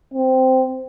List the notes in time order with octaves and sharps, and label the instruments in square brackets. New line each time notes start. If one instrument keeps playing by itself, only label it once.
[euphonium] C4